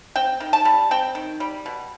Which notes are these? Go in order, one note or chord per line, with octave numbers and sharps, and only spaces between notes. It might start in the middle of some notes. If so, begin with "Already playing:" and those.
C4 G5
D#3
A5
G3
C4 G5
D#3
G3
B2